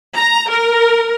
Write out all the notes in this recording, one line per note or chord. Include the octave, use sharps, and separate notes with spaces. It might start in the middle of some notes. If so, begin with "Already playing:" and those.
A#5
A#4